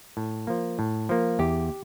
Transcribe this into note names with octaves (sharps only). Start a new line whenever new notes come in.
A2
F3 A#3
A2
F3 A#3
E2 G4